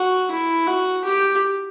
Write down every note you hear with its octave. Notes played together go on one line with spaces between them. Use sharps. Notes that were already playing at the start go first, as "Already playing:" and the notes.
Already playing: F#4
E4
F#4
G4